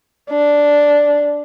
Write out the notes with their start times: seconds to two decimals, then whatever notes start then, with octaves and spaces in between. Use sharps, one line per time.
0.30 D4